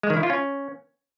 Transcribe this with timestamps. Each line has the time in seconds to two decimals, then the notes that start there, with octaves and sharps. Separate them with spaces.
0.03 G#3
0.10 D#3
0.17 E4
0.23 F4
0.30 C#4